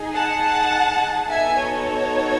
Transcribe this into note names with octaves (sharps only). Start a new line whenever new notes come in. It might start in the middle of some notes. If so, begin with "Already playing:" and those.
Already playing: D#4 G#4
F#5 A5
B3 D#4 F#4 A4 E5 G#5
A4 C#5